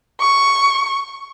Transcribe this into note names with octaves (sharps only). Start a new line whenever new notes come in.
C#6